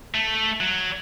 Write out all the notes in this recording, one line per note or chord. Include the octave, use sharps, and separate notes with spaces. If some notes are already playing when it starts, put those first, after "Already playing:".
A3
F#3